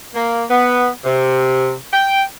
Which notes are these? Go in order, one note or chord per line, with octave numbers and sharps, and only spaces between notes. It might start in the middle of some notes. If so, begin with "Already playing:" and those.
A#3
B3
C3
G5